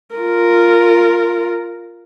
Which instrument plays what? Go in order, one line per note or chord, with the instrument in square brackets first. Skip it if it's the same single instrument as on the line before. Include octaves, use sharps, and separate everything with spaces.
[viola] F4 A#4